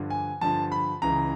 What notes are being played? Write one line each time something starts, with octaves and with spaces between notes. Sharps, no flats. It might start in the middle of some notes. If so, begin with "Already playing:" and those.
Already playing: G2 D3 F3
G#5
G2 D3 F3 A5
B5
C#2 C#3 E3 A#5